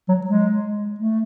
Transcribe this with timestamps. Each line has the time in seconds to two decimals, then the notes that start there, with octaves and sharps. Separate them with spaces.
0.08 F#3
0.26 G#3
0.98 A3